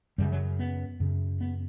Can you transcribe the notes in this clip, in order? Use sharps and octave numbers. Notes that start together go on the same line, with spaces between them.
F#2 C#3 G3
F#3
B3
F#2 C#3
B3